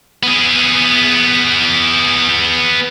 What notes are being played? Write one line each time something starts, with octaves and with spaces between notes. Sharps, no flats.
B3 G#4